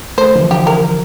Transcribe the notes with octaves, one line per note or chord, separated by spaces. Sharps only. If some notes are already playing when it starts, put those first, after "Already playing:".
A3 C5
D3 E3 F3
G4
A#4